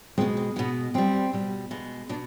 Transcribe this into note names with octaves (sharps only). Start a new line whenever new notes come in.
B2 G#3 C4
C4
B2 G#3 B3
B2 G3 C4
B2 G3
B2 G#3
B2 D4